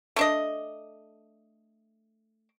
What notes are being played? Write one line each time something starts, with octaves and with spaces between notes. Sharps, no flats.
A3 D4 D#5